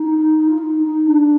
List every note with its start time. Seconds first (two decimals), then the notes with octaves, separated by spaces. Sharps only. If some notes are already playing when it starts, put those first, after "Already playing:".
Already playing: D#4
0.47 F4
0.57 D#4
0.82 D#4
1.06 D4